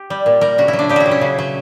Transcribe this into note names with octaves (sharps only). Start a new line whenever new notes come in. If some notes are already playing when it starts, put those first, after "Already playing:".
Already playing: G4
G3
A#2
G3 A#4
C#3 F#4
E4
F#3
D4
C#3 G4
E4 F#4
F#3
C#4
C#3
F#3